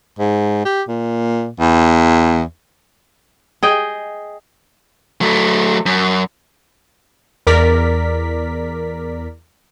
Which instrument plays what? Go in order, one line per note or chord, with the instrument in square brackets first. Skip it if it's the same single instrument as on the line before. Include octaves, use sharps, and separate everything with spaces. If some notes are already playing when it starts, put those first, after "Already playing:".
[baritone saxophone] G#2
G4
A#2
E2
[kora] G#4 D#5 G5
[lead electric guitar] F#3 A3
F#2
[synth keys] E2 A#4 D5 B6